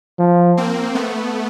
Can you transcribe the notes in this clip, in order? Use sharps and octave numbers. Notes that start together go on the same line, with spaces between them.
F3
A#3 C4
A3 B3